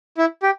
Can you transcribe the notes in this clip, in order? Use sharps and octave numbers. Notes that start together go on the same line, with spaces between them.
E4
G4